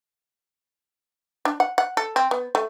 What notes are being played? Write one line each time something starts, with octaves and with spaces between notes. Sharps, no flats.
D4
F#5
F#5
A4
C4
B3
A3